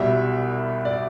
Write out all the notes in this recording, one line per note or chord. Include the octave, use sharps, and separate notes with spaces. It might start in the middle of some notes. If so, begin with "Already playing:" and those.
Already playing: C2 B2 G3 E5
D5